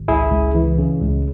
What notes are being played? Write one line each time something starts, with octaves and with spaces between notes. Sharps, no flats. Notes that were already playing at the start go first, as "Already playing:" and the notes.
Already playing: G#1
C#2 E4 G#4
C#2
E3
C#3
C#2